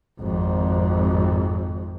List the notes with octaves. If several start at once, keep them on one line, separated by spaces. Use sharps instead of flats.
G#1 F2